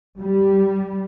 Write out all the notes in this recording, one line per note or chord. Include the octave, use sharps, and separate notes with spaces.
G3